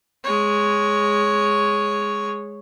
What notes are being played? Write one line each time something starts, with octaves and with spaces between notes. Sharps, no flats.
G#3 C#5